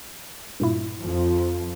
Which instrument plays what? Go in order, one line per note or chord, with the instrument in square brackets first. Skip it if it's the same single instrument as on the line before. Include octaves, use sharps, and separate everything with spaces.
[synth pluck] G2 A#2 E4
[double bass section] F2 F3